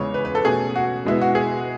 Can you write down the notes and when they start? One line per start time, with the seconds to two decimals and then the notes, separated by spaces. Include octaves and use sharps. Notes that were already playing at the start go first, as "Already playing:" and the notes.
Already playing: E2 C#3 E3 G#3 C#5
0.14 B4
0.25 B4
0.35 A4
0.45 B2 A3 C#4 G#4
0.76 F#4
1.05 B2 G#3 B3 E4
1.21 F#4
1.35 G#4